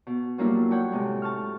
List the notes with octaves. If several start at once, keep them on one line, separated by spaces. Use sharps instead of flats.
B2
F#3 G3 A#3 D4 E4 F4
C#5 F#5 G5 A5
A2 C3 G#3
A5 C#6 F6